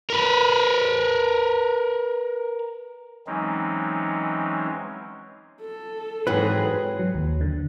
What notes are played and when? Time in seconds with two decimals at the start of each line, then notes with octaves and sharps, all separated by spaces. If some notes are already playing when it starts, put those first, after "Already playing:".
0.10 A#4 B4
3.27 E3 F#3 G#3 C4 C#4 D#4
5.61 A4
6.27 G#2 E3 F#3 C4 G#4 B4
6.99 F#3
7.15 D#2
7.41 D3